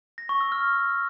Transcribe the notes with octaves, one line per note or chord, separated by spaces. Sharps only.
A#6
C#6
E6
F6